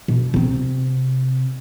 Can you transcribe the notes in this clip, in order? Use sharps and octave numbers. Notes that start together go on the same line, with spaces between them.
B2
C3 C4